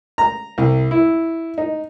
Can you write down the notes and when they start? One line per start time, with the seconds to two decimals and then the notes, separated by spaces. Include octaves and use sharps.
0.18 A#5
0.58 C2
0.91 E4
1.58 D#4